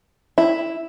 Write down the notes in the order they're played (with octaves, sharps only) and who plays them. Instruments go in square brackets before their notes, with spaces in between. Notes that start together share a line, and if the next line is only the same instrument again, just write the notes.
[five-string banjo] E4